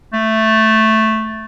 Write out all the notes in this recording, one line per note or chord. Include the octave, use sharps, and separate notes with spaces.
A3